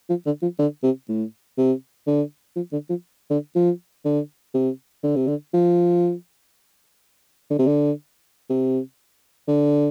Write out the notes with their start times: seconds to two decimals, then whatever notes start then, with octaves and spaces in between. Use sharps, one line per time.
0.09 F3
0.26 D3
0.42 F3
0.59 D3
0.83 C3
1.08 A2
1.58 C3
2.07 D3
2.56 F3
2.72 D3
2.89 F3
3.30 D3
3.55 F3
4.05 D3
4.54 C3
5.03 D3
5.16 C3
5.27 D3
5.54 F3
7.50 D3
7.59 C3
7.67 D3
8.50 C3
9.48 D3